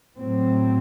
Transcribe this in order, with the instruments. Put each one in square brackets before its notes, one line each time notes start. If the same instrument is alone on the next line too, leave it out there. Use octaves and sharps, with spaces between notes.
[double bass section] A2 F#3 C4